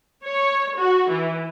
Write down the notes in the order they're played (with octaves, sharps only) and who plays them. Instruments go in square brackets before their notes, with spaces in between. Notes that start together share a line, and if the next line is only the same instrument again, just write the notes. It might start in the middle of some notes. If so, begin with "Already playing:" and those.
[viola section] C#5
F#4
E3